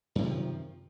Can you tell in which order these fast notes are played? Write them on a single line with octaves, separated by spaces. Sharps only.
F#2 C3 D#3 F3